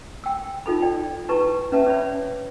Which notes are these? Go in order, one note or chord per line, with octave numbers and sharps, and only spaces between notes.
G5 E6
D#4 F4 A4 B5
D5 G5
E4 G4 B4 A5 C#6
C#4 B4 E5 A5
C#5 D5 E5 B5